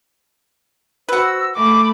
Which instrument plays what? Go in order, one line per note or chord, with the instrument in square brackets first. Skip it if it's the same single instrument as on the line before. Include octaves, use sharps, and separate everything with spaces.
[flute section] F#4 C5 E6 [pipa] B4 F#5
[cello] A3 [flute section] B5 [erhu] D6